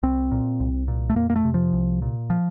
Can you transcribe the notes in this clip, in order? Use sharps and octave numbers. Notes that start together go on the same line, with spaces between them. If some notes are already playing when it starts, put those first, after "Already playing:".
C2 C4
A#2
C2
A#2
A3
F2 A#3
A#3
A3
C3
F3
C2
A#2
F3